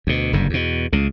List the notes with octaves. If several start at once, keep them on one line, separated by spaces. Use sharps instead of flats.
D2 B2
F#1 G2 D3
E2 B2
C#2 C#3